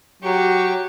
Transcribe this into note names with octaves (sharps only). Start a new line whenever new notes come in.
F#3 G4 C#6